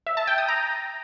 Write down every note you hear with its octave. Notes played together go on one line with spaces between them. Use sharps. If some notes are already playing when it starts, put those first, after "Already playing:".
E5
A5
G5
D#6
A#5